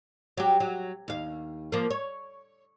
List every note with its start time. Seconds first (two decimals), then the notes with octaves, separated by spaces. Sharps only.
0.37 F#3 G4
0.60 F#3
1.08 D#2 F5
1.72 F3 A#3
1.90 C#5